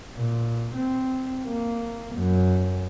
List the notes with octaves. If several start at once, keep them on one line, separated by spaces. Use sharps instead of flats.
A#2
C4
A#3
F#2